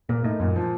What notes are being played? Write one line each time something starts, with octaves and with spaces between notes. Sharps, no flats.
A#2 A#3
A2 D#4
F#2 A#2
F3